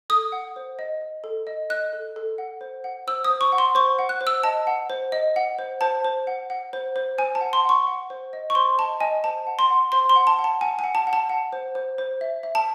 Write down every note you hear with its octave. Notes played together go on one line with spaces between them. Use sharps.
A4 D#6
F#5
C5
D#5
D#5
A4
D#5
D#5 F#6
A4
A4
F#5
C5
F#5
C5 E6
D#6
C5
C#6
F#5
C6
C5 C#6
F#5
F#6
C5
E6
D#5 A5
F#5
C5
D#5
F#5
C5
C5 A5
C5
F#5
F#5
C5
C5
C5 G#5
A5
F#5
C6
F#5 C#6
F#5
C5
D#5
C#6
C5 C6
D#5 A5
D#5 G#5
C5 A5
F#5
C6
F#5
C5 C6
C6
F#5
A5
F#5
A5
F#5 G#5
F#5 G#5
A5
F#5
A5
F#5
C5
C5
C5
E5
E5
A5